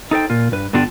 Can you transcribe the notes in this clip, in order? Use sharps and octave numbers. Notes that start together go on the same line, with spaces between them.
D#4 A4 C5 G5
A#2 F4
G2 B4
G2 D3 B3 D4 F4 G5